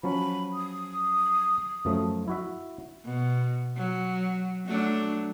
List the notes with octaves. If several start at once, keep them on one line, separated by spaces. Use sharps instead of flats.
F3 F#3 C#4 B5
D#6
F#2 F3 A3
E4 F#4 E5
B2
F#3
F#3 A3 D4